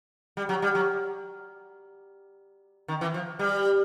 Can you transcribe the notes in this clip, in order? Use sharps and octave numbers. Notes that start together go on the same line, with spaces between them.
G3
F#3
G3
F#3
D#3
E3
F3
G3